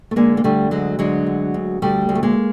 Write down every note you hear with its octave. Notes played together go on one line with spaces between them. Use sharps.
A3
D3 G#3 A#3
A#3
D3 G3 A3
D2 F#3 G#3
D3 F#3 G#3
D2
D2
D2 G3 A3
D2
A3
G#3 A#3